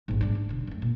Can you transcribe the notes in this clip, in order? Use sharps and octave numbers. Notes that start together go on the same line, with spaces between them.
A1 G#2
G#3 D4
D2
E1 D3
F#2 A3
A#2